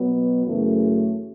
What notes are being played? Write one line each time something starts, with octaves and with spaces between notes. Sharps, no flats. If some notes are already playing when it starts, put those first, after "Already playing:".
Already playing: B2 F#3 B3
F#2 C#3 E3 A3